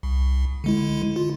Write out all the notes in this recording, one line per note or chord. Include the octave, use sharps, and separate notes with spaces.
C2
D3 G#3 E4
F4